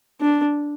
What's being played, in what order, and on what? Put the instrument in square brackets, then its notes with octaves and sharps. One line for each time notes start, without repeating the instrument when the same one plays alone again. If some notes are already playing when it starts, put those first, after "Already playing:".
[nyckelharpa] D4